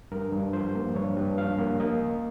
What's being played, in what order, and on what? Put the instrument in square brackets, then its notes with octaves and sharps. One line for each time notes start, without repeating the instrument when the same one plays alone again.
[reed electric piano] G2 A#4
G2
F3 C5
A#3
G2 C#5
G2
F3 F5
A#3
A#3 D#5
C#2